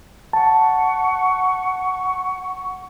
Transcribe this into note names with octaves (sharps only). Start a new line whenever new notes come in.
F#5 A5 C#6